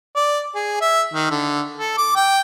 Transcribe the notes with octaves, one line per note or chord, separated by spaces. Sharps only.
D5
G#4
E5
D#3
D3
A4
D6
G5